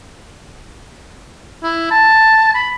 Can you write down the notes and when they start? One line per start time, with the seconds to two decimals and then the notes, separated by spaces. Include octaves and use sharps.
1.63 E4
1.91 A5
2.54 B5